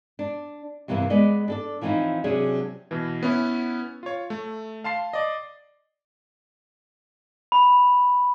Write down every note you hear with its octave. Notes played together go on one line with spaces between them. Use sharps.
D4
G2 C3 E3 A#3 C4
G#3 B3 G#4 D5 D#5
D4 A4 D5
E3 F3 C4 C#4 D#4 E4
C3 F#3 C#4 D4 G#4
B2 E3
B3 C#4 E4
F4 C#5
A3
F5 A5 C6 C7
D5 D#5
B5